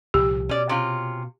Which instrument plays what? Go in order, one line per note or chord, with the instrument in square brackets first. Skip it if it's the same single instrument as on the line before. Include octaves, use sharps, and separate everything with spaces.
[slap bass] C2 A#2 F3 [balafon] G4
[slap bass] B2 [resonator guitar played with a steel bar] C#4 D5
[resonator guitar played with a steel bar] C3 C#4 F4